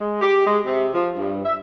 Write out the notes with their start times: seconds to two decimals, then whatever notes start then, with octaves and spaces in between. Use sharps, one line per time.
0.01 G#3
0.21 G4
0.47 G#3
0.66 C3
0.94 F3
1.18 G2
1.45 E5